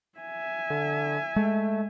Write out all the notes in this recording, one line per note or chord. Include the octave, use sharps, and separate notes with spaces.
E5 G#5
D3
G#3 A3